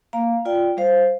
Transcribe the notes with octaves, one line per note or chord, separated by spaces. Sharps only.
A#3 F5 A#5
F4 D5 G5
G3 C5 F5